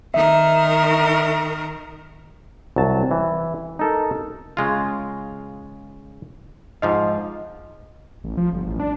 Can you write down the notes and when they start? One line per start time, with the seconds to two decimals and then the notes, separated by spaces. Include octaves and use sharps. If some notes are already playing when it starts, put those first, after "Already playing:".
0.14 D#3 A#4 E5
2.76 C2 F#3 A5
3.11 E3
3.79 D#4 A4 A#4
4.57 C#3 G#3 F4
6.82 G#2 F3 D#5 F5
8.24 A1
8.37 F3
8.53 G1
8.67 A1
8.80 D4